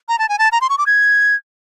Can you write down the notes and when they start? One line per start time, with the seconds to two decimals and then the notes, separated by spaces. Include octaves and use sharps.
0.09 A#5
0.19 A5
0.29 G#5
0.39 A5
0.52 A#5
0.61 C6
0.69 C#6
0.78 D6
0.87 G#6